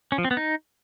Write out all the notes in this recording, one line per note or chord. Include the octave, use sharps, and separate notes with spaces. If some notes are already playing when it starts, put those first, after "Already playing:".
C#4
F3
C4
B3
D#4